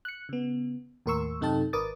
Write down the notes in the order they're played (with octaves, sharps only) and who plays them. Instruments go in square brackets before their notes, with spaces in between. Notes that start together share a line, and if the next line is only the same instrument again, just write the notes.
[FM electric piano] F#6 C#7
C#3 B3
D#2 A2 A#4 C6 C#6 E6
F#2 C3 D#4 A4 G5 A5
G#1 A#4 B4 D6 D#6 A6